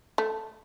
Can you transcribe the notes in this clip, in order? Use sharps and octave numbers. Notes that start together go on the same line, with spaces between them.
A3